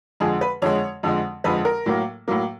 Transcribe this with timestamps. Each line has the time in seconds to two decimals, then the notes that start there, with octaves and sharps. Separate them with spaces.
0.20 F2 D3 F3 G#3 G#4
0.41 B4
0.62 F2 D3 F3 G#3 C#5
1.03 F2 D3 F3 G#3
1.44 F2 D3 F3 G#3 B4
1.65 A#4
1.86 A2 F#3 A#3
2.28 A2 F#3 A#3